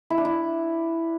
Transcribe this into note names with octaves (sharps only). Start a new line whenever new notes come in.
E4
D4
E4